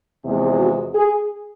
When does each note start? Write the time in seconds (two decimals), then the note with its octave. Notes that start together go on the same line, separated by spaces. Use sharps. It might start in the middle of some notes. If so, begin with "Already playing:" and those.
0.24 E2 C3 F3 G#3
0.59 F#4
0.95 G#4